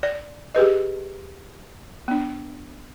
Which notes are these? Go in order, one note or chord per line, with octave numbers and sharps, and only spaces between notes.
D5
G4 G#4 B4 D#5
B3 D4